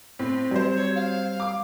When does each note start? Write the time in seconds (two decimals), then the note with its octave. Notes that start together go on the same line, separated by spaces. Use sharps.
0.19 A2 C4
0.51 F#3 G3 C5
0.75 C#5
0.95 F5
1.40 D6